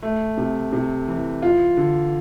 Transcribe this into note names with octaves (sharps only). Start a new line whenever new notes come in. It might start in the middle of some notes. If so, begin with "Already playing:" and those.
A3
C3
C3
E3
F4
D3